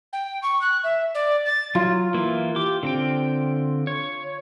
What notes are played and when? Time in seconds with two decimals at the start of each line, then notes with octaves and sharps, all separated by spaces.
0.12 G5
0.42 C#6
0.61 F#6
0.83 E5
1.14 D5
1.45 A6
1.75 F#3 F4
2.14 E3 A#3 E4
2.56 G4 D6
2.83 D3 C4 G5
3.87 C#5